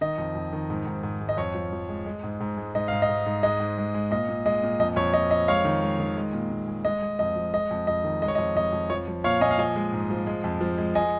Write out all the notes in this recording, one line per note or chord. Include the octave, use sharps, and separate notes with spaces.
D#3 D#5
F2
F2
D#3
G#2
G#2
G#2
G#3
D#5
F2 C#5
F3
F3
G#3
G#3
G#2
G#2
G#3
G#2 D#5
G#2 F5
D#5
G#2
G#2
G#3 D#5
G#2
G#3
G#3
A#2 D#5
A#2
G#3 D#5
A#2
F2 D#5
F2 C#5
F2 D#5
F2 D#5
G#3 C#5 F5
D#3
G#3
D#3
G#3
A#2
A#2
G#3
G#3 D#5
G#3
F2 D#5
F3
G#3 D#5
F2
F2 D#5
D#3
G#3 D#5
C#5
D#5
F2
F2 D#5
F2
F3 C#5
F3
A#2 C#5 F5
A#2 D#5 G#5
F5
F3 D#5 G#5
G#3
G#2
F3
G#3
F2
F3
G#3
G#3 D#5 G#5